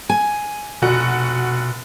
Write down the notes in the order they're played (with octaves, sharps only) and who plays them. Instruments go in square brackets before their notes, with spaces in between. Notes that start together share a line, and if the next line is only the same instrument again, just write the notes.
[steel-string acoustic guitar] G#5
[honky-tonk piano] F1 F#4 [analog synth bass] B2